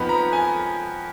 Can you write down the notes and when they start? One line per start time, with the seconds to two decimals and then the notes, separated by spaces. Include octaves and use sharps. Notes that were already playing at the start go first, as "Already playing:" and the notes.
Already playing: F2 F3 B3 D#4 B5
0.09 A#5
0.33 G#5